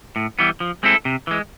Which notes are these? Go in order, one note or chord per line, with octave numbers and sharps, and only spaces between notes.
A2
E3 G3 B3
F3
G#3 C4 E4 A4
C3
E3 G#3